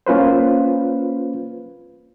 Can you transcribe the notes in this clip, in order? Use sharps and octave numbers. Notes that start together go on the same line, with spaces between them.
A#3 C#4 F4 B4 C5